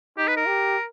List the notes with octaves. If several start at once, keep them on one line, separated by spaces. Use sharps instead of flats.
D#4 G4
B4
A#4
G4